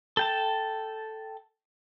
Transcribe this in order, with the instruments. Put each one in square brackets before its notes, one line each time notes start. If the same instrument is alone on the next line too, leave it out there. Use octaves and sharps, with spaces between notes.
[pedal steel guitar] A4 G5 A5